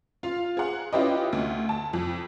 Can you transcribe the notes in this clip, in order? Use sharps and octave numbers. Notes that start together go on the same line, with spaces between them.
F4 F5
G#4 F#5
C#4 E4 F4 G4 B4 D#5
D2
A5
F2